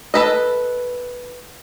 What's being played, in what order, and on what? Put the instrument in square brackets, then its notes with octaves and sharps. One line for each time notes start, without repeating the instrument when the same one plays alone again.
[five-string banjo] A4 B4 D#5